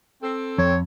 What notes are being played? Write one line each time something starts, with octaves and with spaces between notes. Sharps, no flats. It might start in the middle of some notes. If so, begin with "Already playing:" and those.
C4 A4
F2 C#5